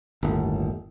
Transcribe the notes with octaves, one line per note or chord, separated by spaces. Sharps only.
G1 D#2 A2